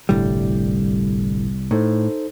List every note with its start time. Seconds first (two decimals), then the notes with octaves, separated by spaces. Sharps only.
0.09 G1 C2 A2 D3 G3
1.71 A2 D#4 A4 C5